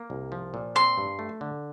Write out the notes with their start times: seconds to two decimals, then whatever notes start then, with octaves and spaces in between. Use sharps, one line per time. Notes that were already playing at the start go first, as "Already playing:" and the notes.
Already playing: A#3
0.10 C2
0.32 F3
0.54 A#2
0.75 C4 C6
0.98 G2
1.19 A3
1.41 D3